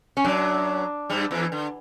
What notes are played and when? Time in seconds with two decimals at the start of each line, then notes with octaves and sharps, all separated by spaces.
0.17 C#4
0.25 F#2 F#3 D4
1.10 G2 G3
1.31 E2 E3
1.52 D3